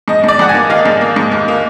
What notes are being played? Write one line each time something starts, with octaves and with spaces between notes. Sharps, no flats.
G#2 D#5
G#2 D5
G#2 F#5
G#5
A#3
D#3 F5
G#2
A#3
G#2
D#2
A#3